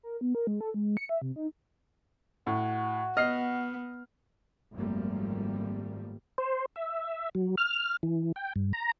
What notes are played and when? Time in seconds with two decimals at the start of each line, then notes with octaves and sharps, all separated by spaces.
0.03 A#4
0.21 B3
0.35 A#4
0.47 G#3
0.61 A4
0.74 G#3
0.97 C#7
1.09 E5
1.22 C3
1.36 D#4
2.47 A2 F#4
3.17 B3 D#5 F6 C7
4.73 G#1 F#2 F3 G3 A3 A#3
6.38 C5
6.76 E5
7.35 F#3
7.58 F6
8.03 E3
8.36 G5
8.56 G2
8.73 A#5